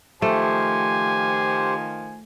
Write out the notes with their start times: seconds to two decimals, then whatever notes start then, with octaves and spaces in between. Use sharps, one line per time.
0.22 D#3 F3 A3 G4 C5 G#5